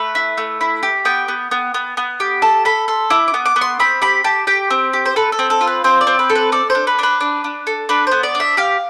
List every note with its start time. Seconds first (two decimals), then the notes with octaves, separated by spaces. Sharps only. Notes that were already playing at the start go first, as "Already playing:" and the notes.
Already playing: A3 B4
0.15 E4
0.37 A3
0.61 E4
0.83 G4
1.05 B3 G5
1.28 B3
1.51 B3
1.74 B3
1.97 B3
2.20 G4
2.42 A4 A5
2.65 A4 B5
2.88 A4 C6
3.10 E4 D6
3.28 D6
3.34 B3
3.46 D6
3.56 B3
3.61 C6
3.80 C4 B5
4.02 G4 B5
4.24 G4 A5
4.47 G4 G5
4.70 C4
4.93 G4
5.06 C5
5.16 A4 B4
5.32 A4
5.39 C4
5.50 A4
5.61 F4
5.67 B4
5.84 C4 C5
6.01 D5
6.07 C4
6.19 B4
6.30 A4
6.35 B4
6.52 A4 D5
6.70 C5
6.75 D4
6.87 B4
6.99 D4 B4
7.21 D4
7.44 D4
7.67 A4
7.89 D4 B4
8.07 B3 C5
8.23 D5
8.35 D4
8.40 E5
8.57 G4 F5